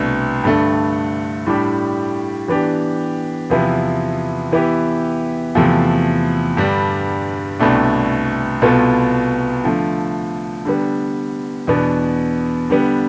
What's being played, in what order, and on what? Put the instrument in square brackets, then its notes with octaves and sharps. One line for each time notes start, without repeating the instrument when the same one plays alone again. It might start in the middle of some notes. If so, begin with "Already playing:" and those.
Already playing: [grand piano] C2 B2 A3 D4
G2 D3 A3
A2 G3 D4 G4
E3 B3 D4 G4
E2 C3 F3 B3 E4
E3 B3 E4 G4
E2 C3 F3 A3
G2 D3 G3 D4
C2 B2 A3 D4
C2 B2 B3 F4 A4
D3 F3 A3
D3 G3 B3
E2 B2 B3 D4
D3 G3 B3